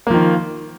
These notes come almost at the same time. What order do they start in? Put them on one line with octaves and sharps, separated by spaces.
A#3 F3 D#3